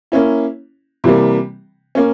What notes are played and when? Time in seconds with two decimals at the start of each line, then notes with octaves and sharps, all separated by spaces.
0.12 A#3 C#4 E4
1.04 C3 E3 G3 A#3
1.95 A#3 C#4